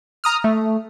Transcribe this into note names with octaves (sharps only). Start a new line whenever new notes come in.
A#5 D#6 F6
A3